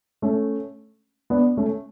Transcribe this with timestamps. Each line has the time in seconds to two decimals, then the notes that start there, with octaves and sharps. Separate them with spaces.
0.22 A3 C#4
1.30 B3 D4
1.57 A3 C#4